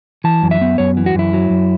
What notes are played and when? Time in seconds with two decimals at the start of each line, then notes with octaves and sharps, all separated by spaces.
0.24 E3 A5
0.43 F#2
0.51 E5
0.61 B3
0.78 F#2 C#5
0.97 E3
1.06 F#4
1.15 F#2 E4
1.33 F#3
1.50 F#2